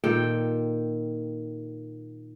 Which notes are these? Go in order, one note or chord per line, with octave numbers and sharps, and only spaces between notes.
A#2 D#3 A4 G5